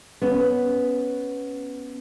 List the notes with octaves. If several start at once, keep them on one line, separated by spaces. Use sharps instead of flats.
B3 C#4